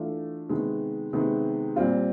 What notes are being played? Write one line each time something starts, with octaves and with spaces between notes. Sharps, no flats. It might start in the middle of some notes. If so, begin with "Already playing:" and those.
Already playing: E3 A3 D4 F4
C3 D#3 G#3 B3
C3 D#3 G#3 B3
A#2 G3 C4 F4